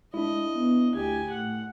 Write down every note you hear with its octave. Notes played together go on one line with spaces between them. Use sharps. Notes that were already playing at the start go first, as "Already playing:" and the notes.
G#3 D4 E4 D#5
B3
D2 G4 G#5
A2 F#5